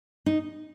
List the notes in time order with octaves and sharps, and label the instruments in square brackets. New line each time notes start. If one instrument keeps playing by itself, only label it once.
[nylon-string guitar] D#4